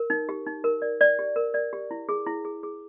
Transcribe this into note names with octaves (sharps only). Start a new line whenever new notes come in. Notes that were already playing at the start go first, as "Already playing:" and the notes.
Already playing: A#4
D#4
G4
D#4
A#4
D5
D5
G4
A#4
D5
G4
E4
G#4
E4
G#4
G#4